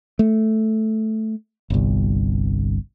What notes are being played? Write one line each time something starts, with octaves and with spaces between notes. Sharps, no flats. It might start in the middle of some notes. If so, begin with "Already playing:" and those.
A3
G1 C2